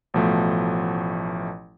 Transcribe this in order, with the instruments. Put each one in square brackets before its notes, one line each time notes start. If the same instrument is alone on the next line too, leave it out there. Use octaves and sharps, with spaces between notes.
[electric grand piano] A1 B2 F3 A3